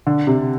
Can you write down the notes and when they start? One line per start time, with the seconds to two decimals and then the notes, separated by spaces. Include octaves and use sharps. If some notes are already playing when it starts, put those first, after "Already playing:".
0.07 D3
0.27 C3